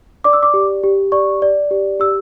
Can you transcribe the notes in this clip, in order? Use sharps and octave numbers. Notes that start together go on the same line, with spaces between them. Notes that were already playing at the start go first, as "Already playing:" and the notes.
D5 D6
E6
D6
G4
G4
D5 C#6
D5
G4
G4 E6